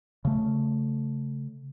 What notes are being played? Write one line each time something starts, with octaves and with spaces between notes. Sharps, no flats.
C#3 A3